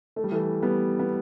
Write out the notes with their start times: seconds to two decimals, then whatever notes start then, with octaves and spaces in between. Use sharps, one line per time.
0.16 A3
0.24 G3
0.32 E3 A3
0.63 G3 B3
0.99 B3